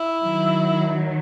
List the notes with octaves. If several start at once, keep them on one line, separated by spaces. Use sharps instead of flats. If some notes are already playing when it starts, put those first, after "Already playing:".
Already playing: E4
D#3 F#3